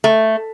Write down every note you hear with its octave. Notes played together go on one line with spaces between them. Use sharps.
A3